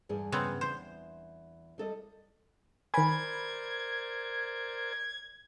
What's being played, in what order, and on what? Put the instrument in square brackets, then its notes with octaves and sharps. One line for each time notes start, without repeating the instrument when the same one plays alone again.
[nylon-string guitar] E2 G2 G#4
[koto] C#3 B3 C4
[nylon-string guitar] E2 [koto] C5
[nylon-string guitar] G3 A4 D#5
[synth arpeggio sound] D#3 G#5 [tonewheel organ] A#4 C5 D5 [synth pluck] B5 [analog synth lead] G#6